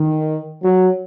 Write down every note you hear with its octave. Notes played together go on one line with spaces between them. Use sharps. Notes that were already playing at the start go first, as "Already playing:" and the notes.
Already playing: D#3
F#3